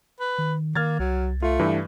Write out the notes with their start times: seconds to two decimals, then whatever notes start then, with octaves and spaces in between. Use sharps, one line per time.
0.20 B4
0.38 D#3
0.75 D#3 A#3 F6 G#6 A6
0.99 C2 F#3
1.42 A3 F4
1.59 G2 E3